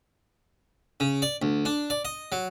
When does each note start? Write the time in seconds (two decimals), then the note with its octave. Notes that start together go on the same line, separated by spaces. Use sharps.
1.00 C#3
1.22 D5
1.42 D2
1.65 D4
1.90 D5
2.05 D#5
2.32 F#3